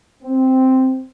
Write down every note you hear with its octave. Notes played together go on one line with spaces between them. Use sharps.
C4